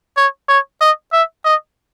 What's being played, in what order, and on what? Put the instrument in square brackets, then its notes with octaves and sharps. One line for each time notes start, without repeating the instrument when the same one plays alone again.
[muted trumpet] C#5
C#5
D#5
E5
D#5